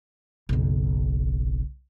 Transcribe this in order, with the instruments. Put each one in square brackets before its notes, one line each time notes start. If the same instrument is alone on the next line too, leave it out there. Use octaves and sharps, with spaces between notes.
[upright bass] F#1 B1